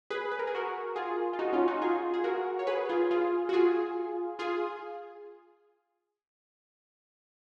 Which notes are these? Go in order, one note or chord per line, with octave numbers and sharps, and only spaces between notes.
G#4 B4
B4
A#4
G#4
F#4 A#4
F4 G#4
F4
D#4 F#4
C#4 F4
D#4 F#4
F4 G#4
G#4
F#4 A#4
C#5
G#4 B4
F4 G#4
F4 G#4
F#4
F4 G#4
F4 G#4